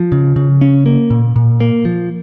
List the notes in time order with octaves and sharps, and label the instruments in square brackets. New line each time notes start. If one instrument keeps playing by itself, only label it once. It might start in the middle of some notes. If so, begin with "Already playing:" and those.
Already playing: [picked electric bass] F3
C#3
C#3
C#4
A#3
A#2
A#2
A#3
F3